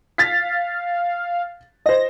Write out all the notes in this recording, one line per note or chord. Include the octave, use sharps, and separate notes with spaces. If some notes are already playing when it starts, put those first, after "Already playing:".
F5 A6 B6
C5 D#5 A#6